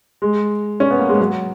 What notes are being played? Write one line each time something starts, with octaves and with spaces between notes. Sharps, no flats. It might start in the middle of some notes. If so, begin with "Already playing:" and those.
G#3
C#4
B3
A#3
G#3
F#3